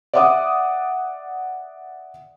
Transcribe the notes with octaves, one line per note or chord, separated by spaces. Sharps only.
D5 E5 F#5 D6 D#6